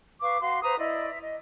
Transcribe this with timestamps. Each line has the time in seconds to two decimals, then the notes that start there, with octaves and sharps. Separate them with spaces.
0.22 B4 F5 C#6 D6
0.40 F#4 F5 C6
0.63 B4 C5 A#5 D#6
0.78 E4 D5 D#5
1.10 E5
1.22 D#5